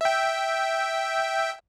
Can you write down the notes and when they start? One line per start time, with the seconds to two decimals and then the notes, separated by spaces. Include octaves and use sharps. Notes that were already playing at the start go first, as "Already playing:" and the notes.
0.01 E5 G5